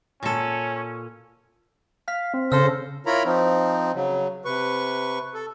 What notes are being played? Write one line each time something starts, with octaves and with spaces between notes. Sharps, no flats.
A#2 C#4 A4
F5 F6 B6
C4
C#3 A4 C5 E6 F6 A#6
E4 F4 A#4 C#5 A#5 B5
F3 C4 D#4
C#3 F#3
C3 B4 C#6
A4